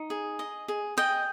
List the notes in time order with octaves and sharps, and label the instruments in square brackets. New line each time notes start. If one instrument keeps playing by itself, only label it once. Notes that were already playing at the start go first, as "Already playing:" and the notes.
Already playing: [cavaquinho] D#4
G#4
D#5
G#4
G#4 D#5 G5